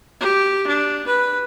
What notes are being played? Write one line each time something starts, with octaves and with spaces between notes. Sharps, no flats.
G4
D4
B4